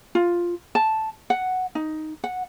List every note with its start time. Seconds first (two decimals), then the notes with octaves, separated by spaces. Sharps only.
0.15 F4
0.75 A5
1.30 F#5
1.75 D#4
2.24 F#5